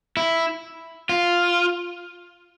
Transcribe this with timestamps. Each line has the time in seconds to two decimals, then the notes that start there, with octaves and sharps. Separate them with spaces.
0.17 E4
1.09 F4